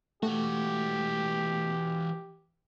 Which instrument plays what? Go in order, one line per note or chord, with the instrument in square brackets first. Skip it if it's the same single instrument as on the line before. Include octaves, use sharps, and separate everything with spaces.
[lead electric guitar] E3 F#4 [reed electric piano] A3 [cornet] G4